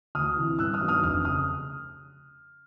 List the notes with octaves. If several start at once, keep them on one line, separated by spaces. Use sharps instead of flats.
D2 D#6 F6
C3 E3
G2 E6 F#6
D#6 F6
D#3 F#3 B3 D4
D#6 F6
F1 D#6 F6
C#3 D#6 F6